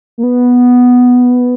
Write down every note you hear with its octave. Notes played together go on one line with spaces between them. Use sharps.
A#3
B3